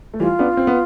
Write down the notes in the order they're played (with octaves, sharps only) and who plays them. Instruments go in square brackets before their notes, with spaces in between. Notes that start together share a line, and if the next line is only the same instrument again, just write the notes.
[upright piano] A3
[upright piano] E3 G3 [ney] F4
[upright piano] B3 D4
C4
B3